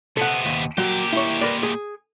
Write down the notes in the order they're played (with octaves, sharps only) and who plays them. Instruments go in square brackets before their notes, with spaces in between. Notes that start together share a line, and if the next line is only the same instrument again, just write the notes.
[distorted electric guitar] C3 B3 [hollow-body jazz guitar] A4 F#5
[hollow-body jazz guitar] D#2
[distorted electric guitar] A#2 G4 [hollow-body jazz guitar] F#3 G3
[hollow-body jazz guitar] E4 C#5
A#4 B4 D5
G#4